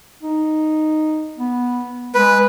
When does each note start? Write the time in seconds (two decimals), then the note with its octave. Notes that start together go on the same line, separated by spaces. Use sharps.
0.23 D#4
1.38 B3
2.14 G#3 B4